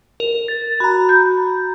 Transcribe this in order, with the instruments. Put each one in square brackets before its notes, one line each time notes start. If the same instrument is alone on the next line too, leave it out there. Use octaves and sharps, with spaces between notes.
[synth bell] A#4
A6
[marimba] F#4 [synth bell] A#5 B5
[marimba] G6